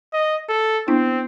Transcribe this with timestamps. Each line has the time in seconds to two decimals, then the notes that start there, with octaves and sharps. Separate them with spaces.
0.13 D#5
0.49 A4
0.88 B3 C4 D4 E4